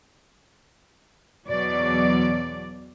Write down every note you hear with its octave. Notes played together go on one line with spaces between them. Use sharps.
E2 B2 F#3 D5